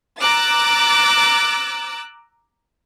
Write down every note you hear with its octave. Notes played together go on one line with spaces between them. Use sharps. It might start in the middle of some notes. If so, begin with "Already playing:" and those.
A#5 D6 E6 F#6 A6